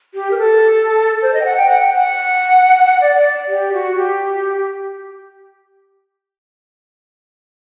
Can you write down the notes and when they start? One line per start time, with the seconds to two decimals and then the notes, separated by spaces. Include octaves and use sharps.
0.14 G4
0.31 A#4
0.38 A4
1.22 C5
1.34 D#5
1.41 G5
1.45 F#5
1.57 G5
1.69 F#5
1.81 G5
1.94 F#5
3.01 D5
3.16 D5
3.48 G4
3.73 F#4
3.96 G4